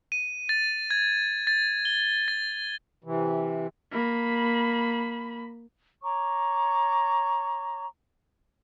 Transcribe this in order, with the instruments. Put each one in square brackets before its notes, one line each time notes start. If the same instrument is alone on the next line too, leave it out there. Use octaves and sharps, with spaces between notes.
[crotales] D#7
A6
G#6
A6
G7
A6
[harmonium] C3 E3
[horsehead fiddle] A#3 B5
[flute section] C#5 A#5 C#6 D6